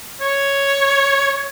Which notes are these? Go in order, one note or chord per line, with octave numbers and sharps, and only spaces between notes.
C#5